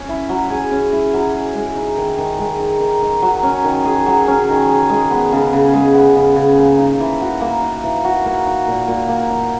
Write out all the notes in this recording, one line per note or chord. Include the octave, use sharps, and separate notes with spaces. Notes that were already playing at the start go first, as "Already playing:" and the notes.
Already playing: C#4
E4
F#3
G#4
C#4
E4
F#3
G#4
G#3
D#4
D#3
D#3
G#3
D#4
D#3
D#3
F#3
C#4
D#3
G#4
F#3
C#4
D#3
G#4
G#3
B3
C#3
C#3
G#3
B3
C#3
C#3
A#3
D#4
E3
F#4
A#3
D#4
E3
F#4
A#3
D#4
A#2
A#2
A#3
D#4